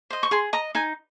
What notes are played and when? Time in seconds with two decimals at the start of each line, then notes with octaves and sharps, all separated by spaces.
0.10 C5 D#5
0.23 C#6
0.31 G#4 C6
0.53 D#5 A#5
0.75 D#4 G#5